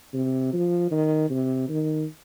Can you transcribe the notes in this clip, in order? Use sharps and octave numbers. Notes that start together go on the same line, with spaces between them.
C3
F3
D#3
C3
D#3